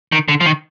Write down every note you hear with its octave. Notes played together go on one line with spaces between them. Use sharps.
D#3
D3
F3
D#3